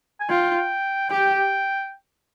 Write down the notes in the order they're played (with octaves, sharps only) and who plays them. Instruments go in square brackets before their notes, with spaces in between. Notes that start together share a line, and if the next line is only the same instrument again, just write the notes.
[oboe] G#5
[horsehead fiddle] F4 [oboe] G5
[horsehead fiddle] G4 [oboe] G5